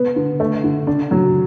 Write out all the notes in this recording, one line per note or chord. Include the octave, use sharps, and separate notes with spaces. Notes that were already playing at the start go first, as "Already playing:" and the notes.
Already playing: B3
D3
A3
D3
D4
F#3